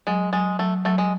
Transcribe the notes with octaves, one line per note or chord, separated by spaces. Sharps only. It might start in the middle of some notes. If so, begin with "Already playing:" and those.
F#3 G#3
F#3 G#3
F#3 A3
F#3 A3
G#3